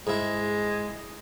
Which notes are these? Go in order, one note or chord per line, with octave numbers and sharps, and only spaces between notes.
G#2 G#3 E4